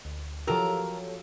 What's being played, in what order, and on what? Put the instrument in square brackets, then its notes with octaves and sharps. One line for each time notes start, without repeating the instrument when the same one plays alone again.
[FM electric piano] D2
[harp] F3 F#3 E6 [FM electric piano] G4 A4 C#5 [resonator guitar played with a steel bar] A#4